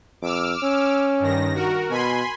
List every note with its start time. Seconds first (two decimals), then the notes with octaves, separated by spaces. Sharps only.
0.22 F2 D6 E6 F6
0.63 C#4
1.20 G2 D#3 A#6
1.55 F#4 A#4
1.90 B2 G#5 B5 C6